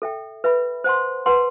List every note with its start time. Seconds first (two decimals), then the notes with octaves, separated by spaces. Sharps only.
0.02 A4 E5 G5
0.44 B4 E5 B5
0.84 C5 F#5 A5 C6
1.26 B4 F#5 A5 C6